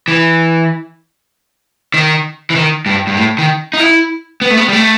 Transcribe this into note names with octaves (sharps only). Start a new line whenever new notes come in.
E3
D#3
E3
D#3
G2
G2
A2
D#3
D#4
E4
B3
A3
B3
G3
A3